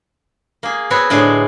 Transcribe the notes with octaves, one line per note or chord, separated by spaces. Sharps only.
A#3 G#4
B3 C4 F#4 B4 C#5
A2 D3 G#3 D4 G#4